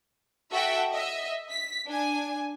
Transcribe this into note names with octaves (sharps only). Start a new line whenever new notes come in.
F#4 A4 E5 F#5 G5
D#5 E5
B6
D4 G#5